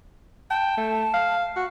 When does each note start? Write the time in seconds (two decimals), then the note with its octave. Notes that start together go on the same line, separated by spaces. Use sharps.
0.50 G5 A5
0.77 A3
1.14 F5
1.56 F#4